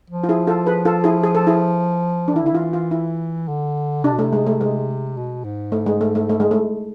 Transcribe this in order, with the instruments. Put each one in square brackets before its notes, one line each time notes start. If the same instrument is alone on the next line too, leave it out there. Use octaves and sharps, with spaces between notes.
[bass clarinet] F3
[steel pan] F4
E4 G#4
F4 A4
G#4 B4
F4 A4
E4 G#4
G#4
A4
E4 G#4
D4
[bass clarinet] E3 [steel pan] E4
[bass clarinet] D3
[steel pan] E4
[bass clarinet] E3 [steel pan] F4
[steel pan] F4
E4
[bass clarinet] D3
[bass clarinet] C3 [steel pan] D4
[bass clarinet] B2
[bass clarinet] C3 [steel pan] A3
[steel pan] G#3
A3
G#3
[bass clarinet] B2
G#2
[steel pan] A3
G#3
A3
A3
A3
G#3
A3